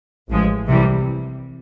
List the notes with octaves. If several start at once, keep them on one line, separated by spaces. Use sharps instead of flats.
A1 A2 F3 G#3
C2 C3 E3 G3